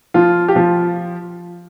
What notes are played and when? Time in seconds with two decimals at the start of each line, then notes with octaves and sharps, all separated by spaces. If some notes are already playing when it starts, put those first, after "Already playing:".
0.14 F3 F4
0.48 G4
0.55 F3 F4